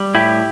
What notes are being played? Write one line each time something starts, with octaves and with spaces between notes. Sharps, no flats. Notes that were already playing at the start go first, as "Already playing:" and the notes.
Already playing: G3
A2 E4 G4